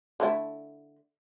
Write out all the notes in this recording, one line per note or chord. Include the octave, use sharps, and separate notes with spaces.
D3 A3 E4